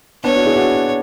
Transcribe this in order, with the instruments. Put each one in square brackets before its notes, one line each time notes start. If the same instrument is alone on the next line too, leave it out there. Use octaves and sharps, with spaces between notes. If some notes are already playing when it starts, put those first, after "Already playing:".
[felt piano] B3 D4 [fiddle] C#5
[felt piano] D4 F#4
E4 G#4
D4 F#4